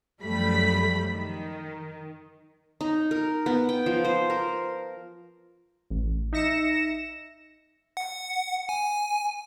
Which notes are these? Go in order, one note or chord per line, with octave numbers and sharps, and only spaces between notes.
F#2 F3 G3 A3 B5 B6
D#3
D#4
A#4
B3
G5
F3
C5
A#4
A1
D#4 E5 A#6 C#7 E7
F#5
G#5